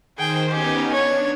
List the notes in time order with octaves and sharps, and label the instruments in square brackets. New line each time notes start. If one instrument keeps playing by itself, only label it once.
[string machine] D#3 C5 [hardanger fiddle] G#4 G5
[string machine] B3 C#4 D#4 [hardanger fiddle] G4 G#5
[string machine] D4 [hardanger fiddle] C#5